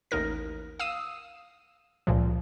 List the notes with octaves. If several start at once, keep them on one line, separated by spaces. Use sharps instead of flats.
A1 D#2 D#4 A#4 A#6
F5 D#6 E6 D#7 E7
C#2 A#2 F3